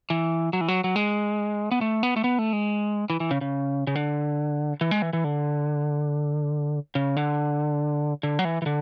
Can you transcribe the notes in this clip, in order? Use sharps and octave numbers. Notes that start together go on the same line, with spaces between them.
E3
F#3
E3
F#3
F#3
G#3
B3
A3
B3
A3
B3
A3
G#3
E3
E3
C#3
C#3
C#3
D3
E3
G#3
E3
E3
D3
C#3
D3
D3
F#3
E3
E3
D3